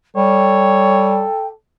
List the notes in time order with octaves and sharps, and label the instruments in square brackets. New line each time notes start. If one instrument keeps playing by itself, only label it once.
[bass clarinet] G3 [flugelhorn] A4 [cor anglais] C#5 [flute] G5